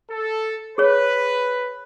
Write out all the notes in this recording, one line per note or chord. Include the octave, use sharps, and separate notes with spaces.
A4
G#4 B4 C#5